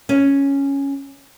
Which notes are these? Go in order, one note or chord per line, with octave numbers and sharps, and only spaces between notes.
C#4